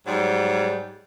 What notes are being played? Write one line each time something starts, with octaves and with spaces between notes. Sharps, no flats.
G#2 F#3 G3